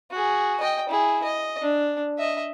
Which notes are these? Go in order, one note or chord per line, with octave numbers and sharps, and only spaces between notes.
F#4 G#4
D#5 G5
E4 G#4
D#5
D4
D#5 E5